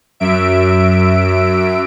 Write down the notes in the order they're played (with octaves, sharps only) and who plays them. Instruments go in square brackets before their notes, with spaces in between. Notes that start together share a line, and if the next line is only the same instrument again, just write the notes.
[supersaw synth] F#2 E5 D7